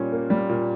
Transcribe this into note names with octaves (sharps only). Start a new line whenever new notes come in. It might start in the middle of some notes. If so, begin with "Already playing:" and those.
Already playing: A#2 G3 C#4
A#3
G3
A#2